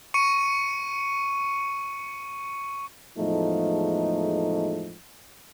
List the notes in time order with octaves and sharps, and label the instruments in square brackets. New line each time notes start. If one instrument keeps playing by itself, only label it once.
[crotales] C#6 C#7 D#7
[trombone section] E2 A2 F3 G#3 A3 D#4